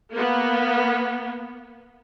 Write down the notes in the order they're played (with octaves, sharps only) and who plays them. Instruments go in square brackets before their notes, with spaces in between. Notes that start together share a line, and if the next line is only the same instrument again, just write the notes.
[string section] A#3 B3